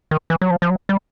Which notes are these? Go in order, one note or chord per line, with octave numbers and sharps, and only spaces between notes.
D#3
E3
F#3
F3
F3
F#3
G3